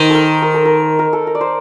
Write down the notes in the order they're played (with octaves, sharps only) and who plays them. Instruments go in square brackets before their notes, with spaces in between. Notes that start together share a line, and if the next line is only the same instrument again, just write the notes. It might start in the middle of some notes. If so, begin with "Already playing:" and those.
Already playing: [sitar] D#3 [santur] C5
[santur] A4 A#4
A#4
A4
A#4
A#4
A4
A#4
D5
C5